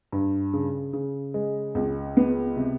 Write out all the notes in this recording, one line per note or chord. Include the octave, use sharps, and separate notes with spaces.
G2
C#3
C#3
G#3
C#2
B3
C3